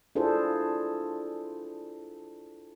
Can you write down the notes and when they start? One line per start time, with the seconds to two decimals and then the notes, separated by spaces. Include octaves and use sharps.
0.15 D4 E4 F4 G#4 A4 C5